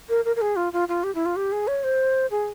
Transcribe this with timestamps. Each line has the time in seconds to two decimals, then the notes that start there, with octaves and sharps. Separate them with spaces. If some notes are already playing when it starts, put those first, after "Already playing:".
0.09 A#4
0.25 A#4
0.36 A#4
0.41 G#4
0.56 F4
0.73 F4
0.88 F4
1.04 G4
1.15 E4
1.26 F4
1.36 G4
1.52 G#4
1.68 C#5
1.84 C5
2.31 G#4